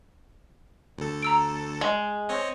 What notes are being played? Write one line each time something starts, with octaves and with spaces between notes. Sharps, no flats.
D2 A4
A#5 E6 D7
G#3
C4 C#5 D#5